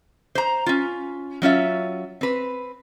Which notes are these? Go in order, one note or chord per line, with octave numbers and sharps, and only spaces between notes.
C5 A#5
C#4 F4
F#3 C#4 F4 E5
C4 B4